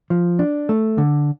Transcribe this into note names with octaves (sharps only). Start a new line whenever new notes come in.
F3
D4
A3
D3